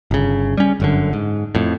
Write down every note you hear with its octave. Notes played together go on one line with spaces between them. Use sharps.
G1 C#3
G3 C#4
G1 F#2 D3
G#2
F2 A2